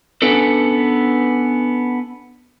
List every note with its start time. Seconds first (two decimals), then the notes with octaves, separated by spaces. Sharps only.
0.22 B3 C#4 D4 A4 B4